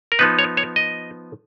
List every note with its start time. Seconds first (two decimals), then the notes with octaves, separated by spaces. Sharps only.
0.12 A#4
0.19 F3 B3 D#4 B4
0.39 C#5
0.57 C#5
0.76 D#5